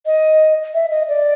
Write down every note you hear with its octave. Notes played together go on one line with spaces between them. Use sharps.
D#5
E5
D#5
D5